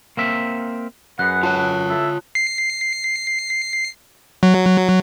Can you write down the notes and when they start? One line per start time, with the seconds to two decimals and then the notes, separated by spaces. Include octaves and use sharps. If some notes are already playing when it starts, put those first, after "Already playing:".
0.17 A#3 C4 E5
1.19 F#2 G#4 B4 F#5 F#6
1.43 F4 C#5 A5
1.90 E4 A4 E5
2.35 C7
4.43 F#3